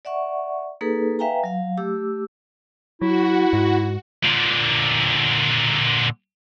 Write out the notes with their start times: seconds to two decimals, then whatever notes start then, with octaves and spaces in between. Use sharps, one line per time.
0.05 D5 E5 F#5 C#6
0.81 A#3 D#4 G#4 A4 B4
1.19 B4 E5 F5 G5 G#5 A#5
1.44 F#3 F5
1.78 A3 G4 D6 E6
3.01 F#3 E4 F#4
3.53 G#2
4.24 A#2 D3